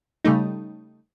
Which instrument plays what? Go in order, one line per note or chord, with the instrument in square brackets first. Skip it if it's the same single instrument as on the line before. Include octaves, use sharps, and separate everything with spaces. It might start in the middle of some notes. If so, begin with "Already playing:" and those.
[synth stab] C#3 G3 A3 D#4